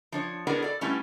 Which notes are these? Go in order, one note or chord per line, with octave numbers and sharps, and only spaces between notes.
F3 D4 C#5
B3 D4 E4 F#4 G#4 A#4
A4 D5
G3 A3 B3 C#4 E4